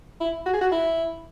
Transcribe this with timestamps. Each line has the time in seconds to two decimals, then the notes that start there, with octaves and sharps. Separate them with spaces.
0.21 E4
0.46 F#4
0.53 G#4
0.61 F#4
0.72 E4